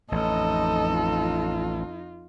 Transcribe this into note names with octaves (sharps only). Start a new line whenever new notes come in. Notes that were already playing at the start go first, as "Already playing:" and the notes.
A1 F2 D#4 A4 D#5
F4